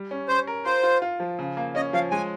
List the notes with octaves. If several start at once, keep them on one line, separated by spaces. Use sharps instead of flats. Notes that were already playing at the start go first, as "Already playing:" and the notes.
Already playing: G3
C#4
C#4 C5
A#4
F4 C5
F4
F4
F3
C#3
A#3
C#4 D#5
F3 F5
G#3 G#5